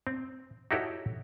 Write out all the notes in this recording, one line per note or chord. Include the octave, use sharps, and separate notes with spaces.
C4
D#4 E4 F#4 G4 A4 C#5